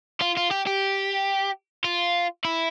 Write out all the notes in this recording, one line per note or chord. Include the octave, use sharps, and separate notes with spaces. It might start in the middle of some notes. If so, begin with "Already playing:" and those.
F4
F4
G4
G4
F4
E4